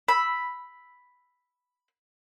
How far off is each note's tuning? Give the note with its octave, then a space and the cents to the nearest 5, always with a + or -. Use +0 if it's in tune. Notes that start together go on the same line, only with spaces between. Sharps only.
B5 +0 E6 +0